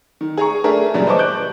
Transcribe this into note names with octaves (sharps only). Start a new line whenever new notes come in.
D#3
G#4 A#5 C#6
A3 D4 G#4 A#4 E5
G2 A#2 C#3 E3 F#3 G3
B4 C5 D#5 A5 C#6 D6
F#6 G6 D7